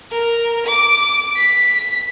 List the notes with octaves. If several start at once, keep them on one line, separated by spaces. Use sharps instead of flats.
A#4
D6
B6